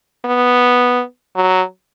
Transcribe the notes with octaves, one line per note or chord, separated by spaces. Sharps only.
B3
F#3